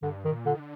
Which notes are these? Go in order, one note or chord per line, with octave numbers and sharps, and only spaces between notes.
G2 D3
D#3
A#2
D3
D#3
D3